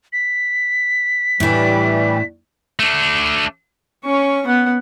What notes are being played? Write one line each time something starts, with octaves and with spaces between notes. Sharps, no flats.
B6
A2 E3 G3 D4
A3 D4
C#4 C#6
B3 F#5